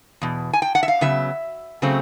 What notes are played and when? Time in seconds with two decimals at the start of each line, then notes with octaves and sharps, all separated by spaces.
0.21 E2 B2
0.53 G#5
0.62 G5
0.75 F#5
0.83 E5
0.88 F5
1.01 C#3 F#3 B3 E5
1.82 C#3 F#3 A3 C4